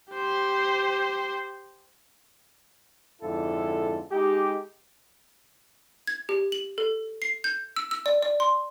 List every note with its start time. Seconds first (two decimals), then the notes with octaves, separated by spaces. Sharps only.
0.13 G4 C5
3.22 F2 G#2 D3 E4 A4
4.11 G#3 D#4 G4
6.07 G#6
6.29 G4
6.52 F#7
6.78 A4
7.22 C7
7.44 G6
7.76 E6
7.91 E6
8.06 D5
8.23 D5
8.40 C6